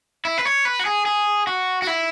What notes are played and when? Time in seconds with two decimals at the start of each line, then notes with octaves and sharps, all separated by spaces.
0.25 E4
0.38 B4
0.45 C#5
0.65 B4
0.79 F#4
0.86 G#4
1.06 G#4
1.47 F#4
1.82 F#4
1.87 E4